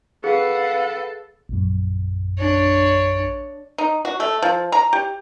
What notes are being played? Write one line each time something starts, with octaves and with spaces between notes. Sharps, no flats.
G#4 A4 B4 F5 F#5
A#1 F#2
D4 C#5
D#4
F#4
A3
F3
A#5
G4